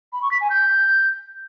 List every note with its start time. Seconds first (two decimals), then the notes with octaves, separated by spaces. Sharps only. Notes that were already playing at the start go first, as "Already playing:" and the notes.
0.13 B5
0.22 C#6
0.31 B6
0.41 G#5
0.50 G6